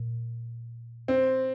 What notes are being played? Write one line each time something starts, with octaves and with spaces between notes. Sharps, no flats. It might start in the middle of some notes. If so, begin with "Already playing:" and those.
Already playing: A#2
C4